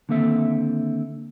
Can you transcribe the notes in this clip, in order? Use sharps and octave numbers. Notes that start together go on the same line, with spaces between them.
D3 D#3 A#3 C4 A4 E5